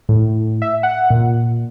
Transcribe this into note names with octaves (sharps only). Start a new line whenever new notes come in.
A2
E5
F#5
A#2